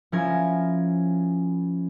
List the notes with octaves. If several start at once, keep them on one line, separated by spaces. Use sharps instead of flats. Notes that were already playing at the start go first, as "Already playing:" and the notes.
F3 C#4 E4 A#4 G#6